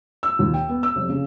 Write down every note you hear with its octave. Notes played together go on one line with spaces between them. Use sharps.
E6
D#2
G5
B3
E6
F1
C#3